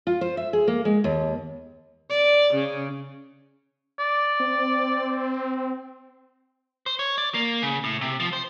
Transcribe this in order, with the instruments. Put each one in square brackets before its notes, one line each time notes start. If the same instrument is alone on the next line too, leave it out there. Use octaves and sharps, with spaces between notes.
[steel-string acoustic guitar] F4
C5
E5
G#4
A#3
G#3
D#2
[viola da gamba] D5
C#3
[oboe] D5
[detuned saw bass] C4
[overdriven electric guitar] C5
C#5
D5
A#3
C#3
A2
C3
F3
C5